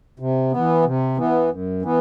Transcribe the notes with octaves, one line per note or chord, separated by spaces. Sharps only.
C3
E3 B3
C3
E3 B3
F#2
E3 B3